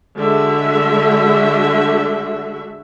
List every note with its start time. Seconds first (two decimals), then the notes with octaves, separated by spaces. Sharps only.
0.17 D3 G#3 F#4 E5